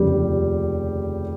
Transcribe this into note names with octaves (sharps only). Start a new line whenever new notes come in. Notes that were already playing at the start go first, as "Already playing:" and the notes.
Already playing: F1 D#2 C#3 F3 G3 G4